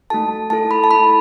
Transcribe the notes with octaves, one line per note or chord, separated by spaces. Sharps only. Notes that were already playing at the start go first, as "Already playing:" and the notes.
A3 D#4 F#4 A4 A5
A3 E4 A4 A5
B5
A5
A3 E4 A4 B5